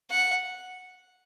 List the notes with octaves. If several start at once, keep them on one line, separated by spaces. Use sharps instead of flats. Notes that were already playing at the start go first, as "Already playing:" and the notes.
F#5